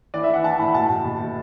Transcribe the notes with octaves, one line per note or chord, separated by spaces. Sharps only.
E3 D5
E5
E3 F#5
E3 A5
A2 B5
B2 A5
B2
B2
B2